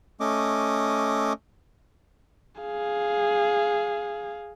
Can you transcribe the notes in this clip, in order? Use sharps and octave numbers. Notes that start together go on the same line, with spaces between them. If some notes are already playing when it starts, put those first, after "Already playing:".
A3 C#4 D#5 D6
G#4 F5